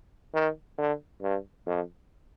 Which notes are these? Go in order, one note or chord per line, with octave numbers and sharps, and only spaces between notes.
D#3
D3
G2
F2